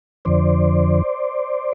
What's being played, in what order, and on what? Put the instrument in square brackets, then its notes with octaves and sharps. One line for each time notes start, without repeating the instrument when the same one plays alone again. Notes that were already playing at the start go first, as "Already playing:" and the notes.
[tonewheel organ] F2 D3 F3 C5 D5